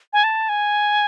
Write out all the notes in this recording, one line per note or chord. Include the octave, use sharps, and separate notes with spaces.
G#5
A5
G#5